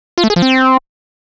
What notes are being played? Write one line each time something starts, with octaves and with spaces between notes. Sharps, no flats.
F4
A3
G#4
F3
C4